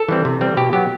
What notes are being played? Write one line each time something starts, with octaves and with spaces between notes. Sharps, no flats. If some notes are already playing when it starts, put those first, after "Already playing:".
Already playing: A4
E3 G3 C4
C3
E3 G3 C4
B2 G4
F#3 B3 G4